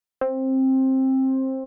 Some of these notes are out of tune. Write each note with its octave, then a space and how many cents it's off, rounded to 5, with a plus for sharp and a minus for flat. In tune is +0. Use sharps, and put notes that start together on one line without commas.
C4 +15